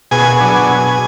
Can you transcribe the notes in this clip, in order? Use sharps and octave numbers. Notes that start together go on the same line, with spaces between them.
B2 G#4 G#5
F#3 B3 D4
B2